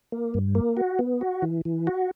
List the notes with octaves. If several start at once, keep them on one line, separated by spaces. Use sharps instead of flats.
A#3
G2
A#3
F#4
B3
F#4
E3
E3
F#4